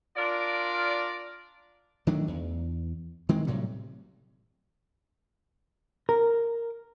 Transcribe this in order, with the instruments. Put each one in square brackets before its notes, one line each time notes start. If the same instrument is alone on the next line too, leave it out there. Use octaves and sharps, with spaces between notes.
[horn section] D4 F4 A#4 D5
[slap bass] D#3 F#3 A3 D4
E2
D#3 G#3 C4
A2 C3 F#3 G3
[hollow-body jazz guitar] A#4